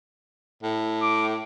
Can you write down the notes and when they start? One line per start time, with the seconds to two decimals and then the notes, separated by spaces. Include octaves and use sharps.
0.63 A2
1.02 D6